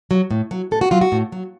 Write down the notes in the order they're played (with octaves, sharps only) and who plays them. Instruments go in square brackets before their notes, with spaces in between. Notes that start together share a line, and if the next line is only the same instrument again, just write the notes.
[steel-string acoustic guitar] F#3
A2
F#3
A2 A4
F#4
F#3 F4
F#4
A2
F#3